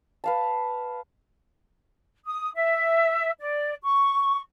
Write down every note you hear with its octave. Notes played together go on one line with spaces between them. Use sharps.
B4 F5 A5
D#6
E5
D5
C#6